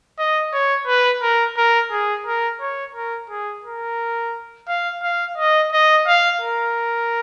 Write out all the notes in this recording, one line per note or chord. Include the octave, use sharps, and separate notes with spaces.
D#5
C#5
B4
A#4
A#4
G#4
A#4
C#5
A#4
G#4
A#4
F5
F5
D#5
D#5
F5
A#4